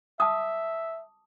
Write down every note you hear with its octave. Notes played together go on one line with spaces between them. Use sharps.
E5 A5 D6 D#6